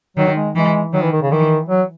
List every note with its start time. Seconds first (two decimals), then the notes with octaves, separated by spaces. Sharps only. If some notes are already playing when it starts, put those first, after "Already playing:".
0.17 D#3 F#3
0.36 G#3
0.55 E3 G#3
0.93 D#3 F#3
1.03 E3
1.12 D#3
1.22 C#3
1.31 D#3 E3
1.69 F#3